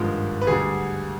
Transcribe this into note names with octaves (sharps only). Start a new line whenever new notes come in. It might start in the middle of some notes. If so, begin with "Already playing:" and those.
Already playing: G#1 G2 F3 G#3 F4
B4
D2 D3 G3 G#4